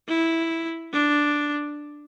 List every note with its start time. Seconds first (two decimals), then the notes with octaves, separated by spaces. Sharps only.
0.08 E4
0.93 D4